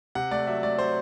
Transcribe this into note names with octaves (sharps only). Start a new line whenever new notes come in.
C3 F#5
A3 D5
F#3 E5
A3 D5
F#3 C5